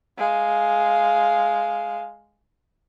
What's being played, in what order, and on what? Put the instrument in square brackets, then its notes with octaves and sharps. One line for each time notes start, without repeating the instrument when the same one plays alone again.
[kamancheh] G#3 F5